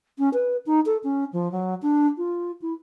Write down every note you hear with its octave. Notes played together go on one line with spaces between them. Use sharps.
C#4
B4
D#4
A4
C#4
F3
F#3
D4
F4
E4